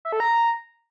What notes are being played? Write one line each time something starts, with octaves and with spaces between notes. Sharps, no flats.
E5
A4
A#5